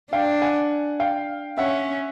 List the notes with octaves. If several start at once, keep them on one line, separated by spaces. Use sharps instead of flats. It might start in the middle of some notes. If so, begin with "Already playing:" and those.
D4 F5 G5
F#5 G#5
F5 G5
C#4 E5 F#5